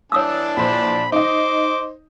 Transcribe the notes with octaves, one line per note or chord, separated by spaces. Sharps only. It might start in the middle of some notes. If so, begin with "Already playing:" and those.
E3 D4 C#5 A5 D#6 E6
A#1 C5 B5
D#4 C5 D#5 D6